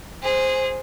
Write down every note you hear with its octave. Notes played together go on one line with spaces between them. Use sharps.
G#4 C5